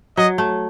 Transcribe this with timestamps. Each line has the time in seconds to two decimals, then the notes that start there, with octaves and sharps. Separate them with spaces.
0.17 F#3 D#5
0.38 A3